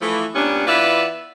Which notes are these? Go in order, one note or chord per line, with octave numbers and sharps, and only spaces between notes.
E3 F3 A3
G2 A#2 G3 B3 C#4 D4
E3 B3 F4 B4 D5 E5